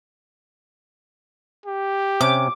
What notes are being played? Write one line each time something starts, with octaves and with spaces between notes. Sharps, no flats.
G4
C3 C#4 D6